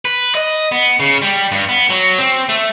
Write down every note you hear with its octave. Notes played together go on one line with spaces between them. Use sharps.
B4
D#5
B3
C#3
G3
G2
B3
F#3
C4
A3